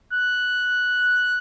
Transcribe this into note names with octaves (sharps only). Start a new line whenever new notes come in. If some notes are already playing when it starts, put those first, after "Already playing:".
F#6